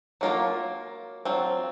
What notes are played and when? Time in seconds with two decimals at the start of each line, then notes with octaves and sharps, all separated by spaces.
0.21 F#3 A#3 F4 A#4
1.25 F#3 C4 F4